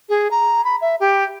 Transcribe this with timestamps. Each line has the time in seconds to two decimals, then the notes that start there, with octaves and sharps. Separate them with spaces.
0.09 G#4
0.31 A#5
0.64 B5
0.81 E5
1.00 G4